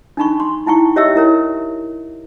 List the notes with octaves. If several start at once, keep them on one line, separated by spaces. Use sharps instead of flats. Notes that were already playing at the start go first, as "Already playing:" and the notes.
D4 D#4 B5 C#6
C6
D#4 E4 G5 C#6
G4 C#5 D#5 E5 G5 E6
E4 A#4 C#5